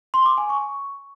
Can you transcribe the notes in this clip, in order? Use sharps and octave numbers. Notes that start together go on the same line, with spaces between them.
C6
D6
G#5
C#6